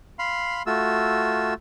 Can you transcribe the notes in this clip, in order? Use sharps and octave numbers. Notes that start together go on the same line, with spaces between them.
F5 B5 C6
A3 F4 F#4 E6